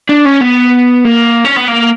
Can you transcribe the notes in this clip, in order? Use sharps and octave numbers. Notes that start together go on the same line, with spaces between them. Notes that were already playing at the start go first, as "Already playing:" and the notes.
D4
C#4
B3
A#3
C#4
B3
A#3